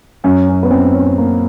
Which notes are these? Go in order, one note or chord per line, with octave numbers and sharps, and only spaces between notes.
F#2 C#4
C#4
B3
F#2 C4
C#4
A#3